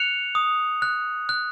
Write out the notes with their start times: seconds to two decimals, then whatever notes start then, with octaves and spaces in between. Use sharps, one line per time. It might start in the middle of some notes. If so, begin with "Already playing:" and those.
Already playing: F#6 C#7 F7
0.35 D#6
0.82 F#6
1.29 F#6